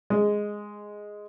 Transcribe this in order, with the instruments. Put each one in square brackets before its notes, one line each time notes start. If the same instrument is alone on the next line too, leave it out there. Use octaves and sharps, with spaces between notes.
[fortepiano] G#3